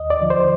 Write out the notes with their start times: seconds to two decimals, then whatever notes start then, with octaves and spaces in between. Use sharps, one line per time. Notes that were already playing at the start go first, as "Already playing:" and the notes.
Already playing: D#2 D#5
0.10 D5
0.21 D3 F3
0.30 C5